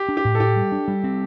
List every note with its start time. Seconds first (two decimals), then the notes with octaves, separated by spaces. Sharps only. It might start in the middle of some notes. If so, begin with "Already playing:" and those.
Already playing: G4
0.09 D4
0.17 G4
0.25 A2
0.35 A4
0.40 A2 G4
0.56 G3
0.72 D4
0.88 G3
1.04 C4